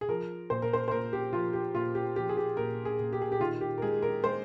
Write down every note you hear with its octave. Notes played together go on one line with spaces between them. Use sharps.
G#4
F3 A#4
A#2 C5
A#4
C5
C5
A#2 A#4
G4
F3 F4
G4
A#2 F4
G4
F3 G4
G#4
G4
A#2 A#4
G#4
A#2
G4
G#4
G4
D#3 F4
G4
A#4
G#3 G#4
A#4
G#3 C5